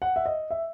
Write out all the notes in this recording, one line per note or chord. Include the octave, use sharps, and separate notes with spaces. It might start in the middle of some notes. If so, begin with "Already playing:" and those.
F#5
E5
D#5
E5